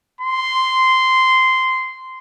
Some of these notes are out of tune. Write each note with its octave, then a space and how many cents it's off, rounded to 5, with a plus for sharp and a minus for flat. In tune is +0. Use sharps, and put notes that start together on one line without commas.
C6 -10